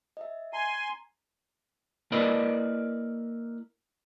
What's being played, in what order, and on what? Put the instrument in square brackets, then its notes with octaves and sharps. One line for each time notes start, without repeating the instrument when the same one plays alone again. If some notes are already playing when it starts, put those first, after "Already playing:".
[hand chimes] D#5 E5
[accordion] G#5 C6 [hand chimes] A#5
[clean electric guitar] A#3 E4 A#4 B4 D5 D#5